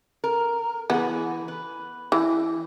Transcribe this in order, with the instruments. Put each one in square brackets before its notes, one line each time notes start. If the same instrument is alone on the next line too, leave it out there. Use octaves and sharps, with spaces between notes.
[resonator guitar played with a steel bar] A#4
[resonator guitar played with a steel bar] E3 G#4 [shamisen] B3
[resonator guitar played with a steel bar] B4
[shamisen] E3